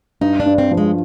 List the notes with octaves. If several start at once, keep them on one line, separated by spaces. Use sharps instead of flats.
G2 D#4
D4
G2
C4
F3
G#3